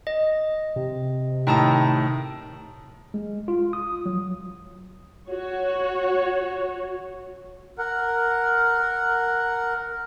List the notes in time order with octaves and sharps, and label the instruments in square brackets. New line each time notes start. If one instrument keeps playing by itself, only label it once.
[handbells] D#5
[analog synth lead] C3
[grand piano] A2 D#3 A#5 [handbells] G5 A5 D#6
[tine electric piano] G#3
F4
D#6
F#3
[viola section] F#4 C#5
[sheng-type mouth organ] A#4 F#5